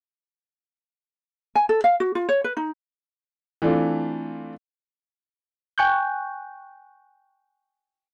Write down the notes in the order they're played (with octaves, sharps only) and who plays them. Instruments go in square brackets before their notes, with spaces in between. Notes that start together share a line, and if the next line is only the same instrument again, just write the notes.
[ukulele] G#5
A4
F5
F#4
F4
C#5
B4
D#4
[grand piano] E3 A3 C4 D4 F4
[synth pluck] G5 G#5 C#6 F#6 G6